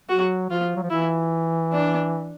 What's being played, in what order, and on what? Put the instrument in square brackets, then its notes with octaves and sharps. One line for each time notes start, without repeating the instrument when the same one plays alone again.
[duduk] F#3 [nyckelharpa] F#4
[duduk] F3 [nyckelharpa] F4
[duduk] F#3
F3
[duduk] E3 [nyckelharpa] E4
[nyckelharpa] D4